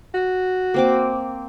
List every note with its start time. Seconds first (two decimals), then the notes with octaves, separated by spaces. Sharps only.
0.14 F#4
0.74 A#3 C4 D6